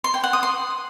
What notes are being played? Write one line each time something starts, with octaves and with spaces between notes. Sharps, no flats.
C6
G5
F#5
D#6
C6